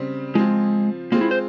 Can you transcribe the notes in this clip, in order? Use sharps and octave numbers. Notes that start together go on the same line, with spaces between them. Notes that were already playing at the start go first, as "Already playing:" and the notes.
Already playing: C#3 G3 C4
F3 G#3 C4 F4
G#3 A#3 C4 F4
E4
C5